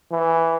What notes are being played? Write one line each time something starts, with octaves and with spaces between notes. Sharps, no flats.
E3